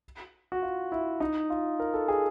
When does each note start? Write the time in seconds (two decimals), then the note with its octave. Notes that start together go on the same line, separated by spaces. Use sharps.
0.52 F#4
0.62 F4
0.92 E4
1.20 D#4
1.50 F4
1.80 A#4
1.94 A4
2.08 G#4